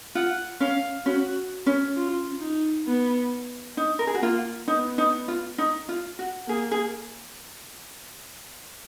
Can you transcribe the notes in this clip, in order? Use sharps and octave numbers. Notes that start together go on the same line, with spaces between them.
F4 F#5
C#4 F5
C#4 F#4
C#4
F4
D#4
B3
D#4
A#4
G#4
F#4
A#3 F4
B3 D#4
D#4
F4
D#4
F4
F#4
A#3 G#4
G#4